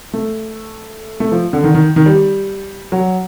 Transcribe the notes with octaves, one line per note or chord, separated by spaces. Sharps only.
A3
A3
F3
D3
D#3
D#3
D#3
G3
F#3